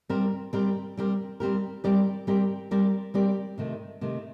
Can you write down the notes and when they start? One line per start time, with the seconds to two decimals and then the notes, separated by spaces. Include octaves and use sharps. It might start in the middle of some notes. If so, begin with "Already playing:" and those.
0.09 G3 C4 G4 A#4
0.53 G3 C4 G4 A#4
0.97 G3 C4 G4 A#4
1.40 G3 C4 G4 A#4
1.84 G3 C4 G4 A#4 D5
2.27 G3 C4 G4 A#4 D5
2.71 G3 C4 G4 A#4 D5
3.14 G3 C4 G4 A#4 D5
3.58 C3 D#3 A3
4.01 C3 D#3 A3